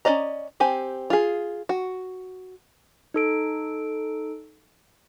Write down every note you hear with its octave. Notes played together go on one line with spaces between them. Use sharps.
C#4 F4 D5 D#5 A#5
C4 G4 G#5
F4 G#4
F#4
D#4 A4 D7